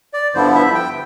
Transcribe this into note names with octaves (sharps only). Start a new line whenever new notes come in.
D5
G2 D3 F3 B3 E4 C5
E5
G5